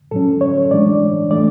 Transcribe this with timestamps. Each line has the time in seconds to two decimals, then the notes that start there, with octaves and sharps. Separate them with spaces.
0.11 A2 F#3 C#4 A4
0.41 C#5
0.71 A2 E3 G#3 D4 D5
1.31 E3 A3 D4 D5